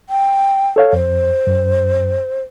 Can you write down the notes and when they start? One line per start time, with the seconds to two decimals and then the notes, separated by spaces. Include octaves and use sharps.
0.09 G5
0.76 A4 C#5 F5
0.93 F2 C5
1.47 F#2